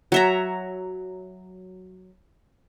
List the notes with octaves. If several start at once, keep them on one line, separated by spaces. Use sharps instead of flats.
F#3 E5 A#5